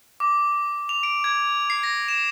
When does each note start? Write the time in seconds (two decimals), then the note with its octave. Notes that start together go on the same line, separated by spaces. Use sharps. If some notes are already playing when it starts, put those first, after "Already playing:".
0.20 D6
0.89 F7
1.03 D7
1.24 G#6
1.70 C7
1.83 A#6
2.08 E7